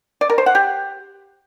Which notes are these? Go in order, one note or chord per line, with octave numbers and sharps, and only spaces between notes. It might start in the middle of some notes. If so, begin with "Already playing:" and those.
D5
A#4
C5
F#5
G4